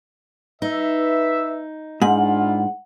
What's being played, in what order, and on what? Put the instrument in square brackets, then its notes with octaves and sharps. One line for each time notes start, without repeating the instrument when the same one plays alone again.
[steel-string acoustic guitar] D#4 [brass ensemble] B4 E5
[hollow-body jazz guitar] G#2 [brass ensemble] D4 E4 F4 [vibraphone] F#5